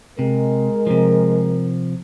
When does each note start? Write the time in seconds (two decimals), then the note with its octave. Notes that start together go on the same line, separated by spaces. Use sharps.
0.19 C3 G#3 A#4
0.87 C3 F3